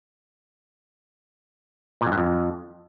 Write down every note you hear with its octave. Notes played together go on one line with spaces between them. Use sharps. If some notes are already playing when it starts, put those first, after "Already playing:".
A#2
F2
G2
F2